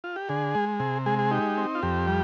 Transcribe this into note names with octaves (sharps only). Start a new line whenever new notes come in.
F4
G4
D3 G#4
G#3
C3 G#4
G#3 G#4
G#4
D#4 G4
C4
F4
F2 G4
G3